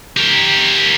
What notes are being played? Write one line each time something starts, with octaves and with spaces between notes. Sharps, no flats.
G4 A#4